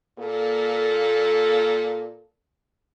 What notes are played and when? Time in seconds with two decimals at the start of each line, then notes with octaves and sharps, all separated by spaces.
0.19 A#2 A#3 A4